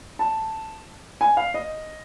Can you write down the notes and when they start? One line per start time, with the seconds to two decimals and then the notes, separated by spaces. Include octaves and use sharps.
0.19 A5
1.21 G#5
1.37 F5
1.54 D#5